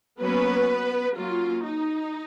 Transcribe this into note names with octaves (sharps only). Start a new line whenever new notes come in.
F#3 A#3 B3 C#4 B4
F#3 A#3 C#4 F4
D#4